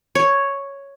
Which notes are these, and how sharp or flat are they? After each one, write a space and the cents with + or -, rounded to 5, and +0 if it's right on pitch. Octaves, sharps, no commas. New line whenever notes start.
C#5 +0